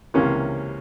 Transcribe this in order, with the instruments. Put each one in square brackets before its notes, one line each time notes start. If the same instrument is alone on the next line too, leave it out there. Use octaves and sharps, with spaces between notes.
[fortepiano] C#2 C3 E3 A#3 C#4